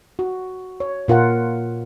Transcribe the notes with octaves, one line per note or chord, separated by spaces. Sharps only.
F#4
C#5
A#2 F4 A#4 F#5